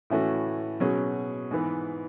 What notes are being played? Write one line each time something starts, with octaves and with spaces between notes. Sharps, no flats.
A2 E3 A3 C#4 F#4
B2 F#3 C#4 G#4
G#2 E3 B3